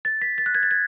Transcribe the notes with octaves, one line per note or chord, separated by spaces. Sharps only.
A6
B6
A6
F#6
G#6
A6
G#6